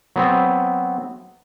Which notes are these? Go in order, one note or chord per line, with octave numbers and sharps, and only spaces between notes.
F#3 B3 C4